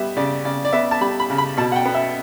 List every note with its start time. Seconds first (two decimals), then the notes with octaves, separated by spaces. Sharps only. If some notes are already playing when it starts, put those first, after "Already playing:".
Already playing: G3 B3 E5
0.17 C#3 D5
0.45 C#3 D5
0.65 D5
0.73 B3 E5
0.91 A5
1.01 G3 B5
1.20 B5
1.30 C#3
1.38 B5
1.57 B2 A5
1.72 F#5
1.76 G5
1.86 B3
1.95 E5